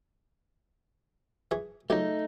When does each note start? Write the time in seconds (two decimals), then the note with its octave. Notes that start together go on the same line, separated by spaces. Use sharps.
1.51 E3 G#4 C#6
1.90 C#2 F#3 A3 D#4 G4